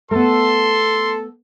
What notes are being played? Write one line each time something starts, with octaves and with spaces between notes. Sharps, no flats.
A3 B3 A4 C6